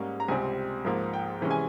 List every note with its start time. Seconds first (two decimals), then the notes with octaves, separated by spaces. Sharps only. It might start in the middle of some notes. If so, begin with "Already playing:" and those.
Already playing: G#2 G3 A#3 C#4
0.20 A#5
0.28 C#2 C3 G3 C4 G#5
0.85 G#2 F3 A#3
1.13 G5
1.41 C3 E3 G#3 C#4
1.51 G#5